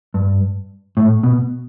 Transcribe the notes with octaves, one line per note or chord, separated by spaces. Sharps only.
G2
A2
B2